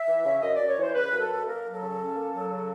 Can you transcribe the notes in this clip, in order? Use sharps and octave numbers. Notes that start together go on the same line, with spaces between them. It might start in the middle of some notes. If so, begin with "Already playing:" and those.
Already playing: E5
E3
C#3
F#2 D#5
F#2 D5
C#5
E3 C5
C#3 B4
F#2
A4
F#2
A#3 A#4
F#3
A4
C#3
C#4
A#3
F#3
C#3